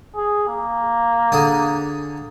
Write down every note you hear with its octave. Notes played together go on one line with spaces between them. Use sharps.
G#4
A#3
D3 G#4